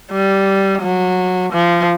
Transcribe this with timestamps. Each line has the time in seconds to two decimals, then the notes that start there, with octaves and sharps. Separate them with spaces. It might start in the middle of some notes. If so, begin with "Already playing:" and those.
0.12 G3
0.82 F#3
1.53 F3